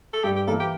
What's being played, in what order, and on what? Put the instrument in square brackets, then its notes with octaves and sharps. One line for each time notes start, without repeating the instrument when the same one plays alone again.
[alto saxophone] A4
[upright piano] G2 [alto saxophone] G4
[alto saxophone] G4
[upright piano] E3 A#3 [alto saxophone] A4
[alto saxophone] G4